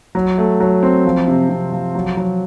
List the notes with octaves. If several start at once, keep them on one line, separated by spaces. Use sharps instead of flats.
F#3
A3
F#3
C4
F3
C3
C3
F3
F#3
F#3